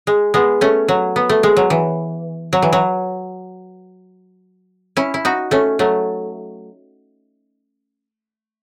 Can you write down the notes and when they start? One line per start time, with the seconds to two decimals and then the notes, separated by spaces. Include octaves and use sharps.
0.07 G#3
0.34 G#3 B3
0.61 A3 C#4
0.88 F#3
1.16 B3
1.29 A3
1.43 G#3
1.57 F#3
1.70 E3
2.53 F#3
2.62 E3
2.73 F#3
4.97 C#4 E4
5.14 E4
5.25 D#4 F#4
5.51 A3 C#4
5.79 F#3 A3